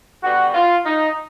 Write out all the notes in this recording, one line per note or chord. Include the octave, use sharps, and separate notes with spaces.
D3 G3 B3 F#4
F4
D#4